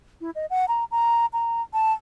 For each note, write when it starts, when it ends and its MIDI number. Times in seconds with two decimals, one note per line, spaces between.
0.21 0.30 64
0.35 0.46 75
0.50 0.66 78
0.68 0.84 82
0.91 1.26 82
1.33 1.62 82
1.73 1.93 81